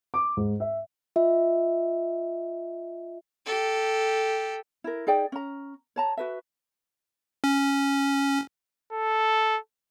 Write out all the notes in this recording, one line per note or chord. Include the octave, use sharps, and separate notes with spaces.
D6
G#2
E5
F4 D#5 E5
G4 A4
E4 A#4
D#4 G#4 D5 G5
C#4 A#5
C#5 A5 A#5
F#4 B4 E5
C#4
A4